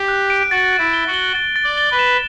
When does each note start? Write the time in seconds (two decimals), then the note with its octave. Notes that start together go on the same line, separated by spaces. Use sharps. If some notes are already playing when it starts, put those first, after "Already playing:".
Already playing: G4
0.08 F#6
0.30 D7
0.51 F#4 A6
0.73 D7
0.79 E4
0.93 G7
1.07 F#4
1.14 G7
1.35 A6
1.56 A6
1.64 D5
1.78 G7
1.91 B4
1.99 E7